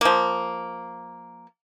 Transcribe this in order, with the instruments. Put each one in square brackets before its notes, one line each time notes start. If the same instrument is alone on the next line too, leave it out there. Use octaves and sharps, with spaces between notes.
[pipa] F3 A#3